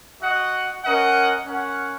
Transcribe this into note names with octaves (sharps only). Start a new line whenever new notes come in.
F#4 D#5 F#5
C#4 A#4 D#5 F#5
C#4 A#4 F#5